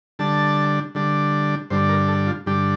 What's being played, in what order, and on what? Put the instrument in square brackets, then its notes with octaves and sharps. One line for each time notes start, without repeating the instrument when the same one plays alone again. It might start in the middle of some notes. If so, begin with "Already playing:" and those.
[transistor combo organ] D3 G3 D4 A5
D3 G3 D4
G2 D3 G3 D4 C5
A#4
A4
F4
G2 D3 G3 D4 G4